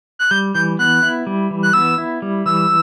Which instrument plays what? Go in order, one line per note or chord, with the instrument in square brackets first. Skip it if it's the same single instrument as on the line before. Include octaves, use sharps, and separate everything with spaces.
[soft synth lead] F#6
[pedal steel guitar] G3 [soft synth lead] G6
[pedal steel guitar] E3 [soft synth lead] G6
[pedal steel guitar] B3 [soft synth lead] F#6
[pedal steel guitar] E4
G3
E3
[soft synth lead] F#6
[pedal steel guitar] B3 [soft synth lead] E6
[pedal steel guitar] E4
G3
[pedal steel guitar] E3 [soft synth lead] E6